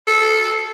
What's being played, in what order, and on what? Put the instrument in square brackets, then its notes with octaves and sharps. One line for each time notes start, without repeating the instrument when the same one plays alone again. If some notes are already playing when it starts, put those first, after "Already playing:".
[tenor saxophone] A4